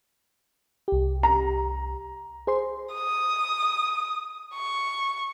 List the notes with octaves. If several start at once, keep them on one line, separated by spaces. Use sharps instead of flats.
C2 G4
A#5
G#4 C5 C6
D#6
C#6